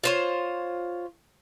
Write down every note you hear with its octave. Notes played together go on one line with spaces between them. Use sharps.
F4 C5 C#5